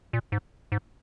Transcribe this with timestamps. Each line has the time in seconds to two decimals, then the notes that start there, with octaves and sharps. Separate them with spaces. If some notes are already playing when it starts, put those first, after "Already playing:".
0.13 A#2
0.32 G#2
0.72 G#2